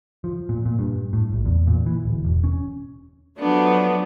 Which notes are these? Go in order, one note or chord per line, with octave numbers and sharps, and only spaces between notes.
F3
A#2
A#2
G2
A2
A#1
E2
A#2
E3
D1
E1
C#4
F3 F#3 A3 B3 D4